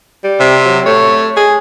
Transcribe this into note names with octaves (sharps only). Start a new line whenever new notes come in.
G3
C3
F#3
A3 C#5
G#4